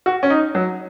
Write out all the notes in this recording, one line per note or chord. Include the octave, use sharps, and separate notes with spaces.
F#4
C#4
D#4
F#3